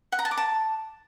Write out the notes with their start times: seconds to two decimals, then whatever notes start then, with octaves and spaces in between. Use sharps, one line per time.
0.12 F#5
0.19 A#5
0.25 A5
0.31 D6
0.37 A5